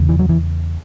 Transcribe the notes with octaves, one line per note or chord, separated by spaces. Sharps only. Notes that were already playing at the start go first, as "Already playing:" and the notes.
Already playing: E2 C#3
E3
F#3
E3